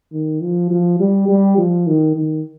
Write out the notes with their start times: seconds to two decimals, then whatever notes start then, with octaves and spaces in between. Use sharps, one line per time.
0.13 D#3
0.41 F3
0.71 F3
1.00 G3
1.28 G3
1.58 F3
1.87 D#3
2.16 D#3